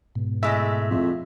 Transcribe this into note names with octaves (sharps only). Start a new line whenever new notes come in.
G#2 B2
A2 G#3 E5
F2